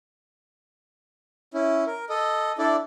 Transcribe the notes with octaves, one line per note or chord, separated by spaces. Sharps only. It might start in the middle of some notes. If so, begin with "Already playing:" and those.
C#4 E4
A#4
A4 D#5
D4 E4 A4 D5